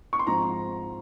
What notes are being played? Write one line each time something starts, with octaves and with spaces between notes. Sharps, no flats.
C#6
C6
G#2 F3 C4 A#5